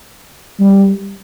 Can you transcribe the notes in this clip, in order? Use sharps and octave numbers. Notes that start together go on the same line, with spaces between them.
G3